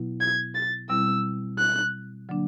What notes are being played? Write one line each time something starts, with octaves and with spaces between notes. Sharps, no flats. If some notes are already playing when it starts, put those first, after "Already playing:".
Already playing: B2 F#3 B3 E4
G#6
A6
B2 G3 C4 E4 E6
F#6
D3 F#3 A#3 D4